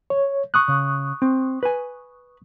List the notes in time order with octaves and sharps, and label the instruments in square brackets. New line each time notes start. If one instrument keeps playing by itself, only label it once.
[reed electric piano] C#5
C#6 D#6 F#6
[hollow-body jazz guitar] C#3
C4
B4 G#5